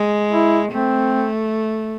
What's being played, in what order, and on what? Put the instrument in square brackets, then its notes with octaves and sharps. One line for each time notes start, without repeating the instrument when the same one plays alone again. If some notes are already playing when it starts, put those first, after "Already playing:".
Already playing: [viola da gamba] G#3
[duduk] E4
[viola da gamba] A3 [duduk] C4